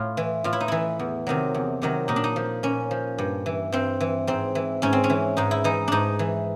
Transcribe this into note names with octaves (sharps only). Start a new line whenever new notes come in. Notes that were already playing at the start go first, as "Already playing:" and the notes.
Already playing: A2 F4
E3
A2 F4
E4
D#4
E3 E4
E2
C3 D#3 F#3
E2
C3 D#3 F#3
A#2 D#4
D4
D#4
F3
A#2 C#4
F3
G2
E3
G2 C4
E3
G#2 C4
E3
G#2 C#4
C4
C#4
E3
G#2 D#4
E4
E3 D#4
G#2 D4 D#4
E3